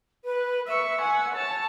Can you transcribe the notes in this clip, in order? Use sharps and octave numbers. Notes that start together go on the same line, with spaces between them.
B4
E5 C#6 E6
F#5 G#5
C#5 A5